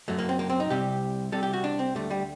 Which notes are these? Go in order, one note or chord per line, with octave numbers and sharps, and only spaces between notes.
F#2 F#3 A3
A#3
C4
A#3
C4
D#4
C2 C3 G3 G4
C2 C3 G3 A4
G4
F#4
D4
C4
D2 D3 G3 A3
G3